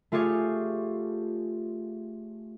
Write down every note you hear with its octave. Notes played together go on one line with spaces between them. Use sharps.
A3 F4 G4 G#4 C#5